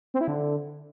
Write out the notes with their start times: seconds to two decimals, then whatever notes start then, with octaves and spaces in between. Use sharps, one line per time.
0.14 C4
0.21 E4
0.28 D3